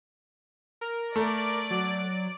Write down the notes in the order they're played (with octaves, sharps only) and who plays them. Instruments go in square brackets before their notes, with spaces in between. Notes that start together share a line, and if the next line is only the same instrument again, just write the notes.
[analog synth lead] A#4
[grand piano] A3 [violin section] D5
[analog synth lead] F#3